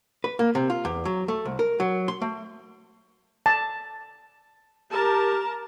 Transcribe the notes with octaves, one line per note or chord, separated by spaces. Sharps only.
B4
A#3
C3
F4
E2
F#3
A3
C2
A#4
F#3
C6
A3
A5
G4 A#4 A5